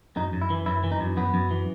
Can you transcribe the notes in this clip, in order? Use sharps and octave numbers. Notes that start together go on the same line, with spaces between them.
F#2 D#4
F#2
E4
E3
F#2 E4
E3
D#4
F#2
F#2 B3
F#2
E3